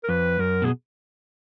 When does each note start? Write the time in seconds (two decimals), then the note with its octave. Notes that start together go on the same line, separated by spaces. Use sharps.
0.04 A#4
0.09 F2 B4
0.39 F#2 A#4
0.62 B2 G#4